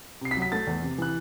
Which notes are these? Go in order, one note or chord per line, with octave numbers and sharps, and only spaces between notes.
C3 C7
B6
F#3
B6
A3 A6
E2
C3
E3 F#6